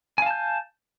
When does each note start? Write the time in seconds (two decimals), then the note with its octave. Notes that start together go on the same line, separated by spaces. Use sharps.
0.18 G#5
0.22 F5
0.26 A5
0.31 G6